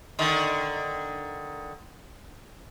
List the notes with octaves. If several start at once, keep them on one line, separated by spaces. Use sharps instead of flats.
D3 D#3